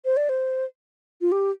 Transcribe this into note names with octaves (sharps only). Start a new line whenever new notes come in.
C5
D5
C5
F4
G4